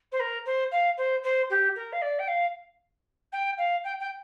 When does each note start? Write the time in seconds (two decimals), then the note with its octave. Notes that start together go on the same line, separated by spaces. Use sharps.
0.12 C5
0.19 A#4
0.45 C5
0.71 F5
0.97 C5
1.23 C5
1.50 G4
1.75 A#4
1.92 F5
2.01 D5
2.19 G5
2.27 F5
3.32 G5
3.58 F5
3.84 G5
4.00 G5